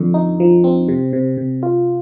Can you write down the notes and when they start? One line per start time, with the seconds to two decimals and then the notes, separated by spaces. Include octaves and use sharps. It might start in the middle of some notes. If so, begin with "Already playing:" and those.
Already playing: F2 D3
0.14 D#4
0.40 F3
0.64 C4
0.88 C3
1.13 C3
1.37 C3
1.63 F4